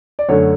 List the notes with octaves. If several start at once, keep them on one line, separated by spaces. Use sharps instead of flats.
D5
F#2 D3 F#3 A3 C#5